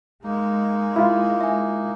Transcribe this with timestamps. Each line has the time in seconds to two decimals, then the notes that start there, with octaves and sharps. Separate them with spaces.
0.24 G#3 A#3 D#4
0.96 E4 F4 F5
1.41 E5 G#5